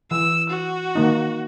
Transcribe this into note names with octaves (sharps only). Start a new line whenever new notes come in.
E3 E6
F#4
D#3 A#3 D#4